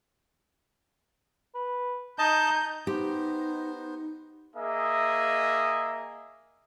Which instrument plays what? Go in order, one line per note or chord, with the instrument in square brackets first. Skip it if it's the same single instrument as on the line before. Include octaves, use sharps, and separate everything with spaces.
[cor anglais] B4
[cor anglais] D#4 [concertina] D#5 A5 [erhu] G6
[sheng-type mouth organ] B3 C5 [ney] D#4 [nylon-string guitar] G4
[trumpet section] A#3 G#4 D#5 E5